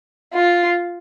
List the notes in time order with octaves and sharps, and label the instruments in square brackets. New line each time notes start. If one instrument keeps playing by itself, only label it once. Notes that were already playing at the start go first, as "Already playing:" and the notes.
[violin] F4